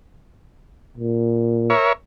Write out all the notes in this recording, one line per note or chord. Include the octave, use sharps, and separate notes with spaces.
A#2
A#4 C#5 E5